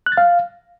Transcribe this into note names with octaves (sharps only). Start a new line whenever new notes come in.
F#6
A6
F5